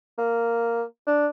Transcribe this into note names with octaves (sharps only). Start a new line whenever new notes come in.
A#3
D4